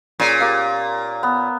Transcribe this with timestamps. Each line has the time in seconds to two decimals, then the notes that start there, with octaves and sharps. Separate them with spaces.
0.20 A#2 C#4 G#4
0.40 G4 A#4 F5
1.23 B3